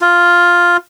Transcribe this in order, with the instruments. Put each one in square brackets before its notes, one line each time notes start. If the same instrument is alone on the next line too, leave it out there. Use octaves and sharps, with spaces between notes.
[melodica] F4